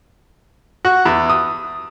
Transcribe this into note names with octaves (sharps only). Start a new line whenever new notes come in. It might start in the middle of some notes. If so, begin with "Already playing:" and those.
F#4
E2
D#6